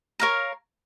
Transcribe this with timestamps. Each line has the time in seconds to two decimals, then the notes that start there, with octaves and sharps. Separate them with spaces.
0.20 A#4 C#5 F5 A#5